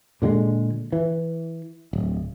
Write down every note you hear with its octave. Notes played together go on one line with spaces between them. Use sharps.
A#2 D3 F#3 G#3
E3
D1